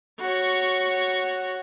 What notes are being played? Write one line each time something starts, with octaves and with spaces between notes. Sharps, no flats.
F#4 C#5